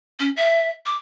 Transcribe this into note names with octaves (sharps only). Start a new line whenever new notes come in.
C#4
E5
D6